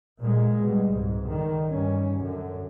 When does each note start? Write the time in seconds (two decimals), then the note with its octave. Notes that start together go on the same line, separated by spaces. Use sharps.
0.21 A#2 G#3
0.63 B2 G3
0.92 C2 G#2
1.29 D3 D#3
1.68 G2 C#4
2.18 F#2 D3